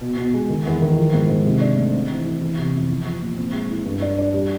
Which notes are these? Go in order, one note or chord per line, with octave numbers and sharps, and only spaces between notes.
B2
B2
G#3
D#3
E2
D#3
F3
G#2
G#2
C3
D4
A3
C4
E3
E4
E3
C3
F2
F3
F3
A#2
C4
G#3
E4
G2
D4
D4
G3